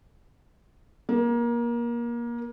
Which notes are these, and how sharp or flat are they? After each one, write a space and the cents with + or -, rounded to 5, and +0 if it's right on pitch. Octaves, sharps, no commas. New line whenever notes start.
A#3 +25